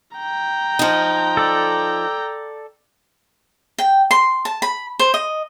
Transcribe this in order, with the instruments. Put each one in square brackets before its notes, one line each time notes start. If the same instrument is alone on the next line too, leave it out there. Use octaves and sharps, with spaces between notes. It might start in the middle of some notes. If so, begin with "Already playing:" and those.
[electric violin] G5 A#5
[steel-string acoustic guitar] F3 D#4
[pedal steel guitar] A4 D5
[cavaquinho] G5
C6
A5
B5
C5
D#5